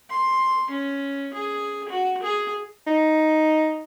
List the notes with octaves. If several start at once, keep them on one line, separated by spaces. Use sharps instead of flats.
C6
C#4
G#4
F#4
G#4
D#4